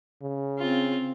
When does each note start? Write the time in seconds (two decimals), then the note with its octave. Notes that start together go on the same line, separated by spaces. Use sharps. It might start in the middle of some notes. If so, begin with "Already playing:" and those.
0.22 C#3
0.58 C4 F4